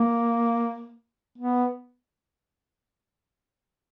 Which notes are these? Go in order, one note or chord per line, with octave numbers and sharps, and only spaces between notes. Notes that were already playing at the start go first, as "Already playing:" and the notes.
Already playing: A#3
B3